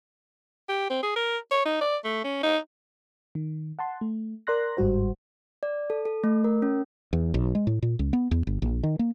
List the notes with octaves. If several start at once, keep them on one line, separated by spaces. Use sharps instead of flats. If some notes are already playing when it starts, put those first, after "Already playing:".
G4
C4
G#4
A#4
C#5
D#4
D5
A3
C#4
D#4
D#3
F#5 A5 C6
A3
A#4 D5 C6 F#6 A#6
G1 G#2 G3 F#4 C5
D5
A4
A4
A3
A#4
C#4
E2
B1
G#3
A2
A#2
C#2
B3
E2
G1
A#1
D#3
A#3